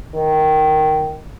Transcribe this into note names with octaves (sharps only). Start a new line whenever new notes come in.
D#3